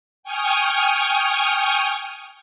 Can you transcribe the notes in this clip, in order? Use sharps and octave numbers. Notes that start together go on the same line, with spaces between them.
G5 G#5 C#6 D#6 F6